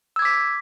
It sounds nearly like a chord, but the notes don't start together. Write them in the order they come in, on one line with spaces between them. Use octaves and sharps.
E6 G#6 D6 B6